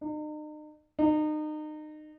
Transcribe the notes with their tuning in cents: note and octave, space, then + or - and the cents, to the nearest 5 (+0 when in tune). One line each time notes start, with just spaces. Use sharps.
D#4 -40
D#4 -30